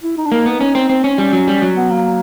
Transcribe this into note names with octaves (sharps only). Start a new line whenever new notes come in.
E4
D#4
D4
A#3 D#4
B3
C#4
C4
C4
C#4
G3 C#4
F#3
G3
F#3
B3
A#3